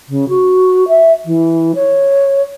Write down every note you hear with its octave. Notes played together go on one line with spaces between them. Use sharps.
C#3
F#4
E5
E3
C#5